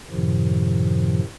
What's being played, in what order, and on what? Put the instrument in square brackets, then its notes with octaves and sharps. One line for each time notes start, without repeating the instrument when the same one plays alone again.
[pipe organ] F#2 A2 C3 D#3 F3